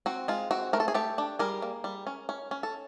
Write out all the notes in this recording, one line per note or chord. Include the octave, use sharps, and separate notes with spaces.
C4 F#4
G#3 F4
C4 F#4
A3 A#4
A4
G#4
A3 G4 A4
D4
G3 G#4 A#4
A#3
G3
C#4
C#4
C#4
A4